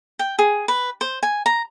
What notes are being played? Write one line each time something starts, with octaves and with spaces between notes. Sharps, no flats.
G5
G#4
B4
C5
G#5
A#5